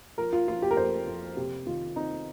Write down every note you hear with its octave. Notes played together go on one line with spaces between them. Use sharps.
F3 A#4
F4
F3 F4
G4
A#4
F2 C5
F2
C3 G4
D#3 F4
C4 D#4